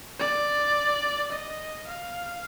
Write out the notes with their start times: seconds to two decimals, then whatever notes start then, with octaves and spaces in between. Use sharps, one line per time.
0.19 D5
1.32 D#5
1.88 F5